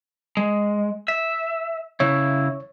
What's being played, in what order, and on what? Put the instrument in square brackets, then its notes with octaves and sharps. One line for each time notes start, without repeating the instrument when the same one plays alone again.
[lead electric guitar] G#3
E5
[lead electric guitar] C#3 E4 [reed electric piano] C#5